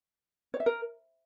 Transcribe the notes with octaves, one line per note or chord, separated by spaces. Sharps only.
C#5
E5
A#4